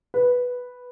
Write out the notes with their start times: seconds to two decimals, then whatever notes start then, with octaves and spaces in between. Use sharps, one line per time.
0.14 B4